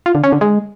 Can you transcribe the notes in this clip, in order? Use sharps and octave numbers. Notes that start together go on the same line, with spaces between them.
F4
D3
C#4
D3
G#3